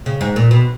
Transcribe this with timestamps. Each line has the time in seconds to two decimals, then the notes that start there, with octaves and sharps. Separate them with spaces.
0.06 C#3
0.21 G#2
0.36 A#2
0.51 B2